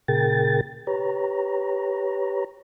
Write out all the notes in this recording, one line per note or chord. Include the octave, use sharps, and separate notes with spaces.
A#2 C#3 G#4 A#4 G5 A6
G4 B4 C#5 A#5